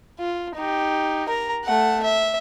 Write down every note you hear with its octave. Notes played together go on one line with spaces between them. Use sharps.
F4
D#4 G4
A#4 A#5
A3 F#5
E5